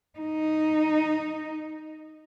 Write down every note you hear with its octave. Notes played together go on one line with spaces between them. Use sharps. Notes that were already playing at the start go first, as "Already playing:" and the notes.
D#4